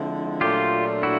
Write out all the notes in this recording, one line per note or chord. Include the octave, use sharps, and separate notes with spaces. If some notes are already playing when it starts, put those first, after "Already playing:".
Already playing: D3 F3 G#3 C4 E4
A#2 F#3 A3 D4 F4 G4
E4 F#4